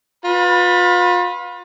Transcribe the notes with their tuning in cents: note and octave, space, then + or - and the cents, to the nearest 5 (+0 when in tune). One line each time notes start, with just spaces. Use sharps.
F4 +35 B4 +0 B5 -10